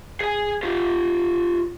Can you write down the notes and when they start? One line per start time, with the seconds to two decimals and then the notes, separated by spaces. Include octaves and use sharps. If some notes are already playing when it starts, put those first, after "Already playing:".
0.21 G#4 G#5
0.63 F4 G4